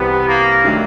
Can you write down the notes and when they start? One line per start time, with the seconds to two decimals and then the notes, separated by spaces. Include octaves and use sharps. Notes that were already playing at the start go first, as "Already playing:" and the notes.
Already playing: C2 C3 E3 G3 B3 C4
0.28 A#3
0.64 D#3 F#3 A3 D4